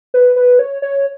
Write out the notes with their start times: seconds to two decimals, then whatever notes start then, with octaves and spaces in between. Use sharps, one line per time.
0.14 B4
0.36 B4
0.59 C#5
0.82 C#5